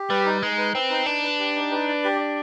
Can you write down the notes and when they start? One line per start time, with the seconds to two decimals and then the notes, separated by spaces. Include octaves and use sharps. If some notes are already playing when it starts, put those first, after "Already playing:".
Already playing: G4
0.09 G3 B4
0.26 D#4
0.42 G#3 D#4
0.58 B4
0.74 C4 B4
0.90 D#4
1.06 D4 B4
1.23 B4
1.39 G4
1.56 D#4
1.71 B4
1.88 D5
2.04 G4
2.20 D5